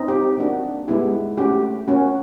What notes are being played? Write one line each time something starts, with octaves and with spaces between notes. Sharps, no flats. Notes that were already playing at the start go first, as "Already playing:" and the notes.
Already playing: C4 D#4
G4
A#3 D4 F#4
G#3 B3 E4 G4
A3 C#4 F#4 G4
A#3 C#4 F#4